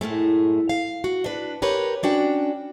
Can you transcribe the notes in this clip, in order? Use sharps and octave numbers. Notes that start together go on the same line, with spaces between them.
F#2 A2 G#3 A3
F5
F#4
D4 B4
G4 A#4 B4 C#5
C#4 D4 F#4 G5